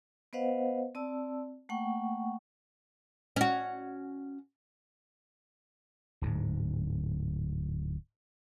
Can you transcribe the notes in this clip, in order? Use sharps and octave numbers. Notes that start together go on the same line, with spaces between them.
B3 B4 C5 D#5 F5 F#5
C4 D5 A5 E6
A3 A#3 F#5 G5 C#6
C#4 F#4
D1 G#2